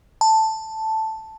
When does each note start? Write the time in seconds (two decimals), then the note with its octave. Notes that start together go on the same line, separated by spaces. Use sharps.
0.21 A5